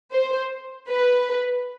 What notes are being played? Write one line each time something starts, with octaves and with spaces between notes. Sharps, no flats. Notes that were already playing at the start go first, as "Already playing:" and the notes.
C5
B4